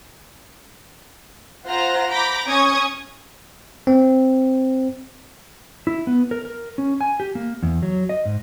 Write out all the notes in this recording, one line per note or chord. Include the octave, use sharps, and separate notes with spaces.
F4 C5 F#5 A#5
A#5 B5 D6 G6 A#6
C#4 C#5 C#6 D#6 G#6
C4
E4
B3
A#4
A#4
C#4
G#5
G4
A#3
E2
F#3
D#5
G#2